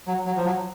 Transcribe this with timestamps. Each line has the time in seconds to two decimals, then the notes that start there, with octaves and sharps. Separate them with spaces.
0.07 F#3
0.26 F#3
0.37 F3
0.46 F#3